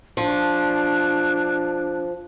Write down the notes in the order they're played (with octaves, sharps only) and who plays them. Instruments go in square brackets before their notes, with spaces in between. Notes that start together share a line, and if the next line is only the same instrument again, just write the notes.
[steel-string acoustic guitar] F3 [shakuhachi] D4